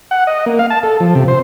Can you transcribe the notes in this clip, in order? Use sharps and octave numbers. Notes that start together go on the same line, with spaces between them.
F#5
D#5
A#3
F5
A5
A4
F3
C3
C5